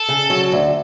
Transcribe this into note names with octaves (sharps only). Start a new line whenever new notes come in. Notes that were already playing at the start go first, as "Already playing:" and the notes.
Already playing: A4
C#3
F#3
D2